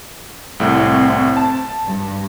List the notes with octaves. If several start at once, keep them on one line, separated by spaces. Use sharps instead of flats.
C2 A2 C4
A5
G2